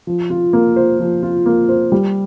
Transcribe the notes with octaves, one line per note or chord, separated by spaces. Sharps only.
F3
F4
A#3
C5
F3
F4
A#3
C5
G3